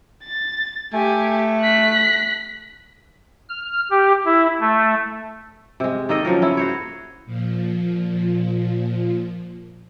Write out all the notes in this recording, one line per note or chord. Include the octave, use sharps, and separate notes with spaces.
A6
A3 G4 G#5
F#6 B6
F6
G4
E4
A3
C3 G#3
D#3 A#3 A4 D#5
C#3 F3 F#3 A#4
C#4 E4
F#4 C5 C#5
A#2 F3